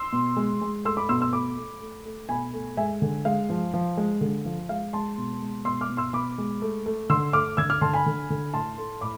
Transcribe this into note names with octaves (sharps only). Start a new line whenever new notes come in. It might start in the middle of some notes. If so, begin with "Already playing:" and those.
Already playing: C6 E6
B2
G#3
G#3
A3 C6 E6
B5 D6
B2 C6 E6
C6 E6
A3 B5 D6
A3
A3
A3
B2 G#5 B5
A3
G#3 E5 G#5
D3
G#3 F5
F3
F3
G#3
D3
F3
G#3 F5
G#3 A5 C6
B2
G#3
B2 C6 E6
D6 F6
B2
C6 E6
B2 B5 D6
G#3
A3
A3
D3 C6 E6
A3 D6 F6
D3 E6 G#6
D6 F6
D3 A5 C6
G#5 B5
D3
D3
A2 A5 C6
A3
A2 B5 D6